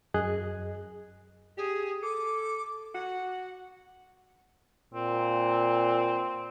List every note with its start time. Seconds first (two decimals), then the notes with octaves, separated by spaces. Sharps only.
0.14 F#2 G#4 D#5 F#6
1.57 G4 G#4
2.03 A4 D6
2.94 F#4 F#5
4.94 A#2 C4